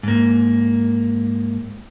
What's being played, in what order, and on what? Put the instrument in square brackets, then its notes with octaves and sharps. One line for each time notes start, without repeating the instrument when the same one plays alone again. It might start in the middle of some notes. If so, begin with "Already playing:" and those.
[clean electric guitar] G#2 A#3